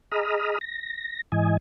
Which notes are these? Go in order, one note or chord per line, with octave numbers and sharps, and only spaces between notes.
G#4 D#5 A#5 B5 D#6 F6
A#6
G#2 E3 D#5 G#5